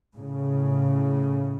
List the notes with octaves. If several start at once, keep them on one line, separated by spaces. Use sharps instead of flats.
A2 C#3